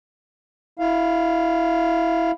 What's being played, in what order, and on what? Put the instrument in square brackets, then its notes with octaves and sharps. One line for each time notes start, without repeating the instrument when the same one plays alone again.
[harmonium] E4 F5